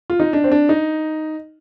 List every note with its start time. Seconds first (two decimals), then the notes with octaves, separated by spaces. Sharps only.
0.10 F4
0.20 D#4
0.33 D4
0.44 C4
0.52 D4
0.69 D#4